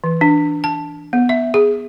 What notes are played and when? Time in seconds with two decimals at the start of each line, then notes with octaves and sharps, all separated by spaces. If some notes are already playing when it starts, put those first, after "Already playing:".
0.04 E3
0.21 D4
0.64 A5
1.13 B3
1.29 E5
1.54 G#4